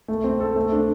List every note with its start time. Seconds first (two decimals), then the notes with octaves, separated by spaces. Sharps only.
0.08 A3
0.24 C4
0.40 A4
0.56 A3
0.72 D4